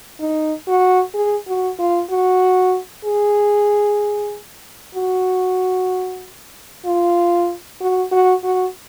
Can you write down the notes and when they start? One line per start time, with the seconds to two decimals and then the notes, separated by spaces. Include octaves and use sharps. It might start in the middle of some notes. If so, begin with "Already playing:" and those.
0.20 D#4
0.68 F#4
1.15 G#4
1.47 F#4
1.79 F4
2.10 F#4
3.05 G#4
4.95 F#4
6.86 F4
7.81 F#4
8.12 F#4
8.43 F#4